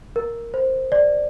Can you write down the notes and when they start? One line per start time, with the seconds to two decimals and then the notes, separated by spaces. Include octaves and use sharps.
0.16 A#4
0.54 C5
0.92 D5